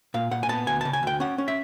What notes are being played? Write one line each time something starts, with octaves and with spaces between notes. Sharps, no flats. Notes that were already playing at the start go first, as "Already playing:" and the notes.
A#2 F5
A#2 F#5
G#5
B3 A5
D2 G#5
C#3 A5
G#5
D2 G5
C#4 F#5
C#4
E5